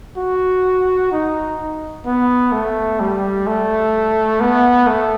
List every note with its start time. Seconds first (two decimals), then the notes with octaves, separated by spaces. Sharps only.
0.17 F#4
1.12 D#4
2.06 B3
2.52 A3
3.00 G3
3.47 A3
4.41 B3
4.87 A3